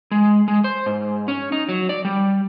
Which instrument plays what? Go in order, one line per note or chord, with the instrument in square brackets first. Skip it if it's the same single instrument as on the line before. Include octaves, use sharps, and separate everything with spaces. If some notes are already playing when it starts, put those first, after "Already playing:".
[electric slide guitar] G#3
G#3
C5
G#2
C#4
D#4
F#3
D5
G3